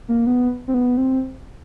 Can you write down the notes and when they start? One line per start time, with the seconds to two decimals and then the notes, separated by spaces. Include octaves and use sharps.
0.09 A#3
0.27 B3
0.68 C4
0.74 B3
0.97 C4